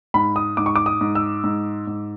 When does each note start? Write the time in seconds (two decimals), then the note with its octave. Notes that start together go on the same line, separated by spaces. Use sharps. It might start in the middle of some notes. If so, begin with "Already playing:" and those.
0.14 G#2 B5
0.36 D#6
0.57 G#2 D6
0.66 C#6
0.76 D6
0.86 D#6
1.01 G#2
1.15 E6
1.44 G#2
1.87 G#2